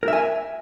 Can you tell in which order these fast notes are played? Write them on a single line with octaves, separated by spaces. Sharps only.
A#4 E5 G#5